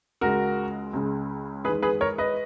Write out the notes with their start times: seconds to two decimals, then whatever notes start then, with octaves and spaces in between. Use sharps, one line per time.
0.21 C#2 C#3 G#3 F#4 A#4
0.93 C#2 C#3 G#3
1.65 E2 G#4 B4
1.67 D#3 G#3
1.82 G#4 B4
2.01 A#4 C#5
2.18 B4 D#5